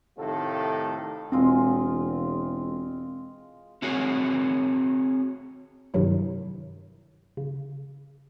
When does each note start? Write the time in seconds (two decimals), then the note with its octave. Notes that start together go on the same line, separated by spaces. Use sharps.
0.17 A2 C3 D#3 A3 F4 A4
1.32 E1 G#3 C4 F4 D#5
3.82 C4 F#4 G#4 A#4 C#5
5.94 G2 C3 D#3 F#3 E4
7.37 C#3